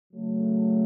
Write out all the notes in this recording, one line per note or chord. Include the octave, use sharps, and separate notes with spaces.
C#3 F#3 A3